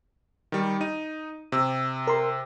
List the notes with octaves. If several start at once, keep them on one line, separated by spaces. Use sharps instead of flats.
D#3 G3
D#4 D#7
C3 E6
A#4 C6